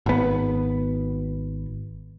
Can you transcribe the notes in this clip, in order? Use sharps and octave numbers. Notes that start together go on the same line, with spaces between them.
G#1 B3